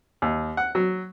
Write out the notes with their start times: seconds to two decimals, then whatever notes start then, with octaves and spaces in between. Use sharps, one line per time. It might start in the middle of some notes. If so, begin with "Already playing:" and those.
0.22 D#2
0.57 F#5
0.75 F#3